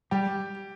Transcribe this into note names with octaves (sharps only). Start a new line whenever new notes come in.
G3 G4